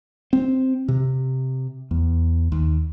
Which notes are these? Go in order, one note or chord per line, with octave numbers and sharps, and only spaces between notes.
C4
C3
E2
D#2